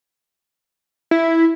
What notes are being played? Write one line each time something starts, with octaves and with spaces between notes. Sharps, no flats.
E4